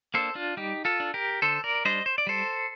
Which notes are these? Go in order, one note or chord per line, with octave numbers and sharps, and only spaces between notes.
A#3 D4 A4 C5
D4 F4
G3 D#4 G4
F4 A4
D4
G4 A#4
D3 A4 C5
A#4 D5
G3 D4 C5 D#5
C5
D5
G3 A4 C5